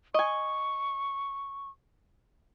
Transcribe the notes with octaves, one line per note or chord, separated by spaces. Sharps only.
D#5 G#5 C#6